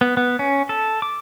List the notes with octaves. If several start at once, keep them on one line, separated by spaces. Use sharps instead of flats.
B3
B3
C#4
A4
D6